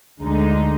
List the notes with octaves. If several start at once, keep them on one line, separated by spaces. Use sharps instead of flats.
D2 D3 G#3 D#4